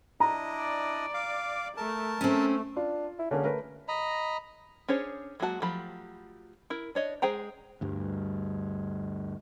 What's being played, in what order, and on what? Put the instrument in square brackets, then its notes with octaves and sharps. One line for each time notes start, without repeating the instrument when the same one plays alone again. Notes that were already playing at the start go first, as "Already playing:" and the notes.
[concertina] D4 E4 D#5 [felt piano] A#5
[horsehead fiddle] D5
[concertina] F5 D6
[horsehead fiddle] A3 [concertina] A#4 A5
[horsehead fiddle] A3 [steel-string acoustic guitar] C4 C#4
[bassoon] D4 [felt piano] F4
[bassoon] E4
[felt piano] D3 A#3 G#4 [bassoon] C#4
[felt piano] A3 A#4 B4
[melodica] D#5 A#5 B5
[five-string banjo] C#4 D4 G#4 C5 C#5
F#3 G#3 A#3 F#4 A5
F3 F#3 A3 G4 B5
E4 A#4
D4 C#5 D#5
G#3 G#4 C5 G5 A#5
[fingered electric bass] D2 G2 G3